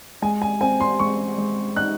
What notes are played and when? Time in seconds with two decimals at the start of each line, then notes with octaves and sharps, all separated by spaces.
0.22 G#3 G#5
0.42 G#5
0.61 C4 G#5
0.80 C6
0.99 G#3 C#6
1.38 G#3
1.76 D#4 F#6